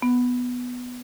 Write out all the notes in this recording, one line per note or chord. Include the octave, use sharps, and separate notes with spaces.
B3